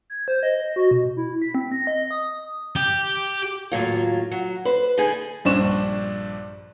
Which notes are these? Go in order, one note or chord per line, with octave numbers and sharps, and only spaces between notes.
G#6
C5
D#5
D#5
F#4
B2
E4
B6
C4
A#6
D#5
D#6
G4
D#2 A2 F#3 F4
F#3
B4 C5
D3 D#4 G#4
A#1 G2 D4 C5 C#6 E7